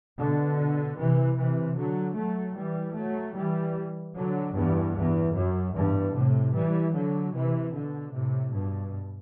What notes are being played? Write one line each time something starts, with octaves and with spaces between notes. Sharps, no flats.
B2 D3
C3 E3
C3 E3
D3 F#3
F#3 A3
E3 G3
F#3 A3
E3 G3
D3 F#3
E2 G2
E2
F#2
E2 G2
A2 C3
E3 G3
D3 F#3
C3 E3
B2 D3
A2 C3
G2 B2